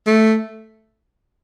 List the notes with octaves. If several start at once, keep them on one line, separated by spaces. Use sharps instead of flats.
A3